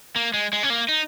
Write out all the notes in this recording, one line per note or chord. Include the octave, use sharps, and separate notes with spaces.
A#3
G#3
G#3
C#4
A#3
D#4